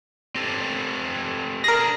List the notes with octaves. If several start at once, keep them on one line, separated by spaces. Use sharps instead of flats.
C4 G4 A4
D4 G#4 A#4 A#6